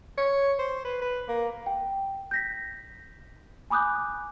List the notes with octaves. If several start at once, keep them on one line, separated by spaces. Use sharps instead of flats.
C#5
C5
B4
B4
A#3
G5
G6 A#6 B6
G#5 B5 D6 D#6 F#6 G6